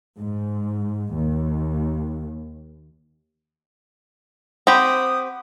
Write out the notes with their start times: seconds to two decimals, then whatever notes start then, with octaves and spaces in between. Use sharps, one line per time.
0.19 G#2
1.14 D#2
4.67 C4 G4 F#5 B5 D#6